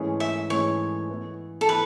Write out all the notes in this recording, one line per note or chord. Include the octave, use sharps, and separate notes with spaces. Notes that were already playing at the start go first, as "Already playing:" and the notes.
Already playing: G#2 E3 A3 C#4 G#4
E5
G#2 E3 A3 C#4 G#4 C#5
E3 B3 E4
A4
E3 B3 E4 B4